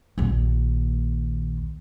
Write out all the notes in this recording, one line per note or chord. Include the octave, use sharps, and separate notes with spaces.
A#1 D#2